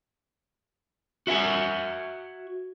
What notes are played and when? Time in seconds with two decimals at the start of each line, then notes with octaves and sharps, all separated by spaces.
1.27 F#4 E5 F#5 G#5